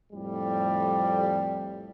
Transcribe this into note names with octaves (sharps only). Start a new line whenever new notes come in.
F2 A2 G3